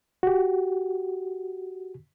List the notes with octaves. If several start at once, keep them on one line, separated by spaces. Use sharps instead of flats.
F#4 G4